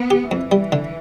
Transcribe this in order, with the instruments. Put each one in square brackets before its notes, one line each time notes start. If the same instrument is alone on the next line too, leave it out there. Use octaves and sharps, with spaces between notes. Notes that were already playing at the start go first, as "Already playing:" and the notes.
Already playing: [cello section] B3
[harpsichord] G4
[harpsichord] F2 [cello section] E3
[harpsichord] G3
D3